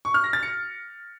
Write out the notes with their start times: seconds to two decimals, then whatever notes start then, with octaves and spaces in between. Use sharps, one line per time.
0.05 C#6
0.14 F6
0.24 A#6
0.33 A6
0.43 C#7